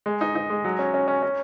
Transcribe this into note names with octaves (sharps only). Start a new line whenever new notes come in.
G#3
D#4
D#4
G#3
F#3
C#4
C#4
C#4
C#4